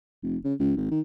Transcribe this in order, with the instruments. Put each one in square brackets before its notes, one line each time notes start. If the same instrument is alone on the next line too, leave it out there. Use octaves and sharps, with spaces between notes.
[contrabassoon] F1
C#3
C#2
G#1
D#3